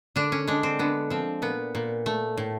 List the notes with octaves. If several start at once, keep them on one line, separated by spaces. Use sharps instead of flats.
D3 D4
C#4
G#3 D4
C4
D3 B3
F3 C4
A#2 B3
A#2
A3
A2